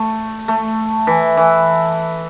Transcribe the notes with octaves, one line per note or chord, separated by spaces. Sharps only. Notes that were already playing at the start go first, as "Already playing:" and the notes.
Already playing: A3
A3
E3
E3